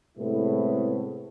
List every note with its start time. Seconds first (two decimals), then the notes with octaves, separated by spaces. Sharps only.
0.18 A2 C3 G#3 A3 B3 E4